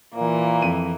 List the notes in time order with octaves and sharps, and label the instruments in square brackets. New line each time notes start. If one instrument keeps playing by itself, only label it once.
[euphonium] A#2 [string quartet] E3 A#3
[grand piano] F2 D#7